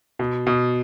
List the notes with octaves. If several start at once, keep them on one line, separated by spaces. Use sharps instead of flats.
B2
B2